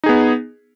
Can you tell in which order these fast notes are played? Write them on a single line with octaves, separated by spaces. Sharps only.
D#4 G#4 B3